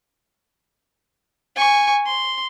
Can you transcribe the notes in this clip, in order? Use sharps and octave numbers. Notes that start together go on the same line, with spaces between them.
G#5 C#6
C6